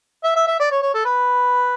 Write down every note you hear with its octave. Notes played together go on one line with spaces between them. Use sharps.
E5
E5
E5
D5
C#5
C#5
A4
B4